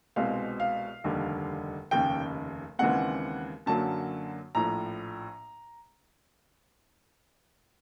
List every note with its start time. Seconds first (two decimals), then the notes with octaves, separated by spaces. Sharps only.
0.16 C2 B2 G#3 C4 F5
0.60 F5
1.04 F1 D#2 D3 G3
1.91 F1 D#2 C#3 G5
2.79 D#2 C#3 E3 G#3 C4 F#5
3.66 F#2 D3 F#3 A#3 A5
4.55 A#1 A2 F3 A#5